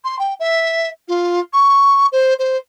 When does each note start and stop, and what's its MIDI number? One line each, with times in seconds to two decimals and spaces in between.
0.04 0.16 84
0.19 0.34 79
0.39 0.89 76
1.08 1.39 65
1.53 2.06 85
2.12 2.34 72
2.39 2.57 72